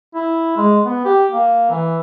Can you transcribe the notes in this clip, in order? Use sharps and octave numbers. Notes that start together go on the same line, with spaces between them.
E4
G#3
B3
G4
A#3
E3